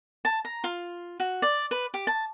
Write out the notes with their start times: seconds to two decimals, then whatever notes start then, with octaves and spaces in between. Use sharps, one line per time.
0.25 A5
0.45 A#5
0.64 F4
1.20 F#4
1.42 D5
1.71 B4
1.94 G4
2.07 A5